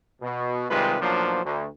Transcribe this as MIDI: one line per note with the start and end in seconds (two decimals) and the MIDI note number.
0.22 0.65 47
0.70 0.98 48
0.70 0.98 51
0.70 0.98 55
0.70 0.98 56
0.70 0.98 65
0.70 0.98 71
1.01 1.41 35
1.01 1.41 53
1.01 1.41 54
1.01 1.41 58
1.01 1.41 62
1.01 1.41 72
1.45 1.67 38